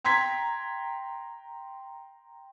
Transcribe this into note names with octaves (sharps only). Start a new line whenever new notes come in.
G5 A#5 C6 G#6 B6